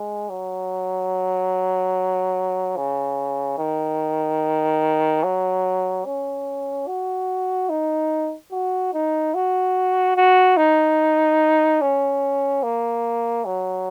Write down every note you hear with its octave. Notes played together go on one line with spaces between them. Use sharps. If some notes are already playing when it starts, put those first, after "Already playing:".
Already playing: G#3
F#3
C#3
D#3
F#3
C#4
F#4
D#4
F#4
D#4
F#4
F#4
D#4
C#4
A#3
F#3